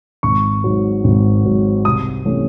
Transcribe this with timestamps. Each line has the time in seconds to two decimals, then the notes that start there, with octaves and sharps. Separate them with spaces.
0.23 G#1 C#6
0.64 G#2 F#3
1.04 G#1
1.45 G#2 F#3
1.85 C2 D#6
2.25 C3 E3 A3 C#4